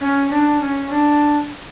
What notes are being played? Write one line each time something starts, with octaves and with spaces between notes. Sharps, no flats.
C#4
D4
C#4
D4